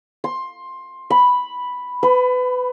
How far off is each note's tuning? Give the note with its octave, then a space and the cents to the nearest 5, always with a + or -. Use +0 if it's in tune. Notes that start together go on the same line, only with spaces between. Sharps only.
C6 +15
B5 +0
B4 +25